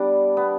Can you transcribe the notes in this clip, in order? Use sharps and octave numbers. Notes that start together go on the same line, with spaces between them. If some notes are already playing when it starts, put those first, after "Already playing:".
Already playing: G3 B3 D4 D5
B3